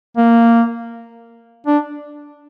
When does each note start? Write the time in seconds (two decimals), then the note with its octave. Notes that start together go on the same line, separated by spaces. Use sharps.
0.17 A#3
1.67 D4